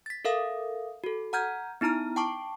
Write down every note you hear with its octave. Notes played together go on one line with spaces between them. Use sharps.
A6 B6
A4 A#4 E5 F5 D#6
F#4 A4
F#5 A#5 F6 G6 G#6
B3 D#4 E4 A#5 F6
G5 A5 C#6 D6